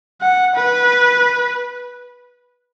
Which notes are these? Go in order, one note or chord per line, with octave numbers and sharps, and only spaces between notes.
F#5
B4